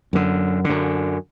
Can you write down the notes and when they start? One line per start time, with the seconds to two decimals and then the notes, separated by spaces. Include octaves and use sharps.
0.13 F#2 D3
0.64 D3
0.70 F#2